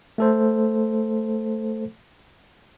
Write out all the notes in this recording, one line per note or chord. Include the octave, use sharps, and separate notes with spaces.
A3 A4 C5